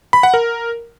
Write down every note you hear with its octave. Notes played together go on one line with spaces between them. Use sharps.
B5
F#5
A#4